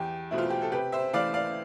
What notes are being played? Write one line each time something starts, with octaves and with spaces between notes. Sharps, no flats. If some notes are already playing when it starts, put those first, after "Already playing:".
Already playing: E2 G4
B2 A3 C4 E4
F4
G4
A4
C3 G4 B4
C5 E5
E3 A3 D5 F5
D5 F5